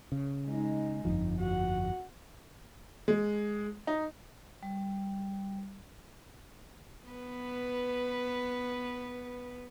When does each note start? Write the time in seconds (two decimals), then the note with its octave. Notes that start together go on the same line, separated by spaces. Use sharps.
0.12 C#3
0.46 G#3 D#4
1.05 G1 F2 F3 D#4
1.39 F#4 F#5
3.08 G#3
3.87 D#4
4.63 G3
7.09 B3 B4